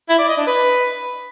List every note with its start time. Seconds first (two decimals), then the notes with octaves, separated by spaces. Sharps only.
0.09 E4
0.19 D5
0.28 D#5
0.38 D4
0.47 B4